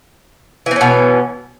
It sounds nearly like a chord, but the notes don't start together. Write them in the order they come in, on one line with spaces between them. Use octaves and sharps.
E3 C4 C#4 B2